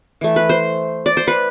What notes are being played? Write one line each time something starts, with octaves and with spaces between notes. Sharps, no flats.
E3 A3
B4
C5
D5
C5
B4